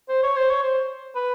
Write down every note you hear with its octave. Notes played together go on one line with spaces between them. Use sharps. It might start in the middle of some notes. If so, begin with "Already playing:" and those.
C5
C#5
C5
C#5
C5
B4